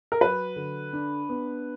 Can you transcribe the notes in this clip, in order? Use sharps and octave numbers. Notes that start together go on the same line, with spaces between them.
A#4
F#3 B4
D3
D4
B3